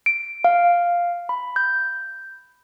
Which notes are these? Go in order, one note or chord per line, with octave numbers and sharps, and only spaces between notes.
D7
F5
B5
G6